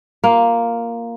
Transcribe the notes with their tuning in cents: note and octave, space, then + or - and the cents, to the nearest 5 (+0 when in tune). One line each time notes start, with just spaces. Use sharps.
A#3 +0 F4 +0